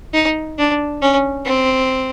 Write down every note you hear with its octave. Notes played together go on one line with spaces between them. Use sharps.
D#4
D4
C#4
C4